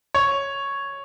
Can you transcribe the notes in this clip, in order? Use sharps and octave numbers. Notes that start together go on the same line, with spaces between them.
C#5